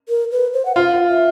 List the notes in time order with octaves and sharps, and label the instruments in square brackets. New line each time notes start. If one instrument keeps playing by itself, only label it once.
[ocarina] A#4
B4
C5
F#5
[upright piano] F4 [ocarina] F5
[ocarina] E5